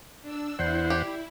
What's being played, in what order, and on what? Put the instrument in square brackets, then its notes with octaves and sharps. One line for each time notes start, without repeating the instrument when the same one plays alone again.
[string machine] D4 E6
[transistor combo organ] E2 C5 F#5 [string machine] E4 [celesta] D5 G6 C7
[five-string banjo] G4